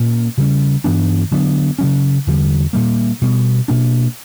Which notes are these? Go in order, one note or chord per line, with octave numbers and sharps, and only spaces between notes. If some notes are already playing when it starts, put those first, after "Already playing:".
Already playing: A#2 A#3 C#4
C#3 G3 C#4
G2 E3 B3 D4
D3 F#3 B3 D4
C#3 F#3 C#4
E2 D3 G3
A#2 G3 A#3
B2 G3 B3
B2 A#3 D4